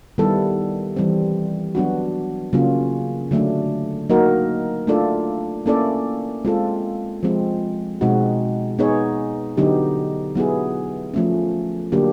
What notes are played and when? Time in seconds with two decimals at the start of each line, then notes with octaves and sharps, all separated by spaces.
0.18 D#3 G3 B3 E4 A4
0.96 E3 G3 C4
1.75 F#3 B3 D4 F#4
2.53 C#3 F#3 A#3 C#4 F4
3.31 D3 F#3 A3 D4
4.09 F#3 A#3 D#4 F#4 A#4
4.87 A3 D4 F4 A4 D5
5.66 A#3 C#4 E4 A4 D5
6.45 G#3 C4 F4 A4
7.23 F3 G#3 C4
8.01 B2 G#3 C4 D#4 F#4
8.79 B3 D#4 G#4 C#5
9.57 D3 F#3 B3 D#4 G4
10.35 F#3 B3 E4 G#4
11.14 F3 A3 C#4
11.92 D3 F#3 A#3 D4 G4